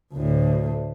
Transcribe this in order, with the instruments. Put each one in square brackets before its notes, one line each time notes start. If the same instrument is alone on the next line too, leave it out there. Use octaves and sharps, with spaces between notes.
[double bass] D2 A2